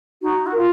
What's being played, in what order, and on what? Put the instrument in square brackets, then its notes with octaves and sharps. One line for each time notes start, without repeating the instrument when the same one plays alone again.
[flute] D#4 [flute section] F#4
[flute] F#4
[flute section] A#4
[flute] F4